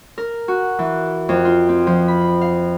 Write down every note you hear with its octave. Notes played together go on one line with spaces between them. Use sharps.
A#4
F#4
E3
F2
F4
C4
F3
B5
F5